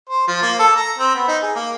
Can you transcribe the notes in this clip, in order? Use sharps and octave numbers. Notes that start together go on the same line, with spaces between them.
C5
F3
A#3
A4
A#5
C4
B3
D#4
G#4
A#3